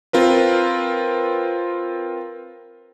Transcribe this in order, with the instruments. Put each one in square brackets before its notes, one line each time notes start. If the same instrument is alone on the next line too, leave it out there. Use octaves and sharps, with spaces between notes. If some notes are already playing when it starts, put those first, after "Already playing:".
[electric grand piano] C4 F4 A#4 B4